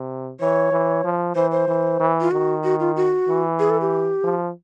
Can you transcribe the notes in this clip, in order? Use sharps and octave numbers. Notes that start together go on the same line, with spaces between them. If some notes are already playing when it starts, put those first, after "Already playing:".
Already playing: C3
E3 C#5
E3
F3
E3 C5
C5
E3
E3
F4
D#3 F#4
F#4
F4
F#4
E3
G#4
A4
G4
F3